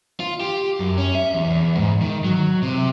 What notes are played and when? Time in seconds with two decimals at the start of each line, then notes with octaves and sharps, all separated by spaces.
0.20 F4
0.40 G4
0.80 F#2
0.98 C#4
1.15 E5
1.34 E2
1.50 E2
1.77 G#2
2.02 D#3
2.25 F#3
2.63 C3